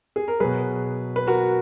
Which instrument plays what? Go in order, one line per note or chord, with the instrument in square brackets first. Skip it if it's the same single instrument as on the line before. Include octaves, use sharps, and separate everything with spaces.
[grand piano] G#4
A#4
B2 F#3 G#4 B4
B4
F#4 A#4